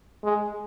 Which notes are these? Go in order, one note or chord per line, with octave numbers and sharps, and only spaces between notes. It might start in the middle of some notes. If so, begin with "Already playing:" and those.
G#3